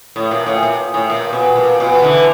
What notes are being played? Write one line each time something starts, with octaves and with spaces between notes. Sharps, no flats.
A2
A#2
A2
A#2
A2
A#2
B2
A#2
B2
D3 E3